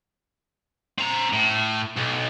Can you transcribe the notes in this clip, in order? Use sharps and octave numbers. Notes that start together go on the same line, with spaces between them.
C4 A#5
A2
B1